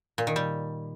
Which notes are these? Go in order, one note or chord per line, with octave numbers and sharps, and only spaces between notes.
A#2
D#3
G3